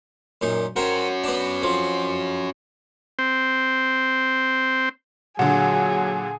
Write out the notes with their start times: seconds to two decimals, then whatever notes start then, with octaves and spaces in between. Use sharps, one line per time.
0.41 F#2 A#2 D#4
0.76 C#4 F#4 A#4 C5 G5
1.24 B3 D4
1.63 F2 F3
3.19 C4 C5
5.39 A#2 D3 F#3 G#4 F#5